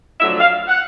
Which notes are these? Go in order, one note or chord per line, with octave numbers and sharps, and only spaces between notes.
F2 D3 F#3 A3 E5
F5
F#5